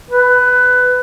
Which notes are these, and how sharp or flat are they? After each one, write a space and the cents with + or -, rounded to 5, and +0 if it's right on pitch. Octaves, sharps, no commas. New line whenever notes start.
B4 +15